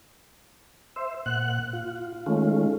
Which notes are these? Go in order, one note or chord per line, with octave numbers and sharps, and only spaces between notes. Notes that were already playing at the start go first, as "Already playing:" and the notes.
C5 E5
A#2 F#5 F#6
F4
D#3 G#3 A3 C#4 F4